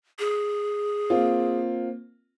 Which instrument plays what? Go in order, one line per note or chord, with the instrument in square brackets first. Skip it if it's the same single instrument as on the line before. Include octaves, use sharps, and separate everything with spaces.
[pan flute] G#4
[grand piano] A#3 C4 F4